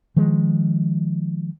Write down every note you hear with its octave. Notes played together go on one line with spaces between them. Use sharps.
D#3 F3 G#3